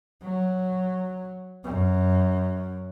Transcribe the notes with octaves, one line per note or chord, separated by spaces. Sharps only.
F#3
F#2